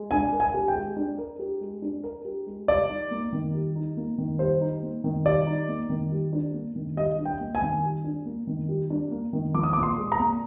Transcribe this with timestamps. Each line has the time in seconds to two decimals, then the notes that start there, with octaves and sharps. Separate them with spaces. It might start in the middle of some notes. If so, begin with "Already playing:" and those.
Already playing: G#3
0.11 D4 G#5
0.32 A#4
0.40 G#5
0.54 G4
0.68 G5
0.75 G#3
0.97 D4
1.18 A#4
1.39 G4
1.61 G#3
1.82 D4
2.04 A#4
2.25 G4
2.47 G#3
2.68 G3 D5
2.90 D#4
3.11 A#3
3.33 D#3
3.54 G3
3.75 D#4
3.97 A#3
4.18 D#3
4.39 G3 C5
4.61 D#4
4.83 A#3
5.04 D#3
5.26 G3 D5
5.46 D#4
5.68 A#3
5.90 D#3
6.12 G3
6.33 D4
6.54 A#3
6.76 D#3
6.97 G3 D#5
7.18 D4
7.25 G5
7.40 A#3
7.55 G#5
7.62 D#3
7.83 G3
8.04 D4
8.26 A#3
8.47 D#3
8.69 G3
8.90 D4
9.11 A#3
9.33 D#3
9.54 F3 D6
9.63 D#6
9.73 D6
9.76 A#2
9.83 C6
9.98 G#3
10.12 A#5
10.19 A#2